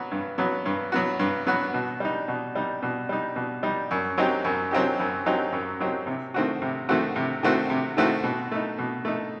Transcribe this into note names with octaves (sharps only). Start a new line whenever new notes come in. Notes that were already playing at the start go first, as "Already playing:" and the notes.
Already playing: F#3 B3 F#4
G2
F#3 B3 F#4
G2
F#3 B3 F#4
G2
F#3 B3 F#4
B2
G3 D#4
B2
G3 D#4
B2
G3 D#4
B2
G3 D#4
F#2
F#3 C4 D#4 G4
F#2
F#3 C4 D#4 G4
F#2
F#3 C4 D#4 G4
F#2
F#3 C4 D#4 G4
C3
D#3 A3 C4 F#4
C3
D#3 A3 C4 F#4
C3
D#3 A3 C4 F#4
C3
D#3 A3 C4 F#4
B2
A3 D#4
B2
A3 D#4